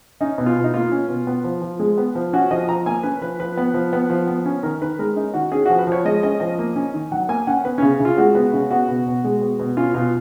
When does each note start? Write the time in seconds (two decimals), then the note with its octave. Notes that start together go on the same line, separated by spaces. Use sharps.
0.21 C#4 D#4
0.38 B2
0.46 F4
0.56 B2
0.64 D#4
0.74 A#3 F4
0.92 C#4
1.08 B2
1.27 B3
1.44 F3
1.62 F3
1.79 G#3
1.98 B3
2.15 F3
2.33 C#4 F#4
2.51 F3 D#5
2.69 F3 A#5
2.86 A#3 G#5
3.03 C#4 B4
3.21 F3 B4
3.39 F3 B4
3.57 B3
3.74 F3
3.93 B3
4.10 F3
4.27 B3
4.46 C#4
4.63 D#3 A#4
4.81 D#3 B4
4.99 G#3 A#4
5.16 C#4 D#4
5.34 D#3 F#4
5.52 C#4 G#4
5.66 F3 F#4
5.79 B4
5.87 F3
5.92 C#5
6.05 G#3 D#5
6.23 C#4 D#5
6.40 F3 D#5
6.59 A#3
6.76 C#4
6.94 D#3
7.12 F#3 F#5
7.29 A#3 G#5
7.47 C#4 F#5
7.65 B3 B4
7.78 C#3 C#4
8.00 C#3
8.05 F4
8.17 G#3 F#4
8.35 B3
8.53 C#3
8.71 B3 F#4
8.89 B2
9.06 B2
9.24 G#3
9.42 B3
9.59 B2
9.77 C#4 F4
9.94 B2 F4